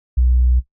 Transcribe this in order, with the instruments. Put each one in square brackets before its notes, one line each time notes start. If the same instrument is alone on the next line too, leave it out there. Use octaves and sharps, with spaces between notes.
[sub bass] B1